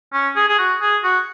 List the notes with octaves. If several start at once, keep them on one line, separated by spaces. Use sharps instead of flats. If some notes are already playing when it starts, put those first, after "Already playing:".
C#4
G#4
G#4
F#4
G#4
F#4